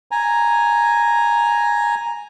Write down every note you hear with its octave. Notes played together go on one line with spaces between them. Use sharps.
G#5 A#5